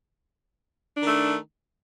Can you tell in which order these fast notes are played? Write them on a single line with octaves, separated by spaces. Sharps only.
D4 D#3 A3